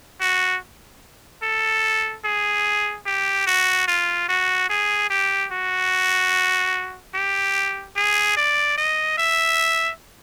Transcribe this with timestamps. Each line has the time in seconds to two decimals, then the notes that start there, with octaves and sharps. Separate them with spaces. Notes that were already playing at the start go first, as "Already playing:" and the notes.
0.21 F#4
1.43 A4
2.25 G#4
3.06 G4
3.47 F#4
3.88 F4
4.29 F#4
4.70 G#4
5.10 G4
5.52 F#4
7.15 G4
7.96 G#4
8.37 D5
8.78 D#5
9.18 E5